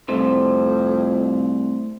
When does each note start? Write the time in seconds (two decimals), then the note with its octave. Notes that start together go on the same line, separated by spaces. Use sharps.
0.09 C2 F2 A3 C5